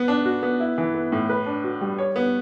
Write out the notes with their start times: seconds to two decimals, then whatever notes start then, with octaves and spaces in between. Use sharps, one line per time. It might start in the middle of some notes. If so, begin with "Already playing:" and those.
Already playing: B3
0.08 D4
0.26 F#4
0.43 B3
0.60 E4
0.78 E3
0.94 B3
1.12 A2
1.29 B4
1.46 D4
1.64 F#4
1.81 G3
1.98 C#5
2.16 B3